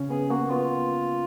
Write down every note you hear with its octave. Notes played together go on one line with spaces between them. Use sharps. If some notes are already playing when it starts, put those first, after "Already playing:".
Already playing: C#3 C#4
B3 G#4
A#3 F#4
B3 F4